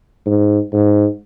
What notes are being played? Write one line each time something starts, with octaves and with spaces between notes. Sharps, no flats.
G#2
G#2